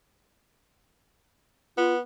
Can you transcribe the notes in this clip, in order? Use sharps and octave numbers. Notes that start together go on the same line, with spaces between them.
B3 F4